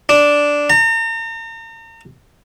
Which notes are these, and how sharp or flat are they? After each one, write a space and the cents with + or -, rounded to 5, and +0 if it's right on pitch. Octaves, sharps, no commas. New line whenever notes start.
D4 -5
A#5 -40